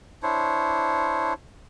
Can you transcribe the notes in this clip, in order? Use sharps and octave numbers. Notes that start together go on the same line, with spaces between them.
D4 E4 C5 C#5